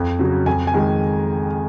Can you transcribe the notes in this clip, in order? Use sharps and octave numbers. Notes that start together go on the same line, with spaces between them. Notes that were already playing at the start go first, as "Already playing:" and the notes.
Already playing: F2
C#3 F#3
F2 G#5
G#5
D#3 G#3